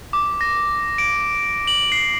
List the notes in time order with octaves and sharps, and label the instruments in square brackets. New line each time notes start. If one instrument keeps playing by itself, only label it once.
[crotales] D6
A#6
D7
F#7
C7